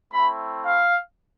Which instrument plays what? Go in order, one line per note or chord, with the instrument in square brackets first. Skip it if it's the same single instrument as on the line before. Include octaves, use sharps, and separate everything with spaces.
[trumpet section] A3 C4 E4 B5
F5